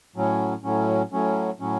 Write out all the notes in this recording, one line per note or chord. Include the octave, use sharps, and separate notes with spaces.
A2 F#3 C#4
A2 F#3 C#4
A2 F#3 C#4
A2 F#3 C#4